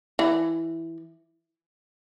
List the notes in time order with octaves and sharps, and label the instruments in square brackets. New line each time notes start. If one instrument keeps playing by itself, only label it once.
[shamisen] E3